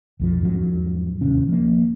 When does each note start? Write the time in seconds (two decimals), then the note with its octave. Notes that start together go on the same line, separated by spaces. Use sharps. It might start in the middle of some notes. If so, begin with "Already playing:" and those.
0.20 B1 F2 F3
0.41 E2 G#2 F3 F#3
1.21 D1 D#2 C3 C#4
1.48 F3 A#3